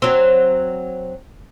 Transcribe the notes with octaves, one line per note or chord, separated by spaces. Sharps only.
F#3 C4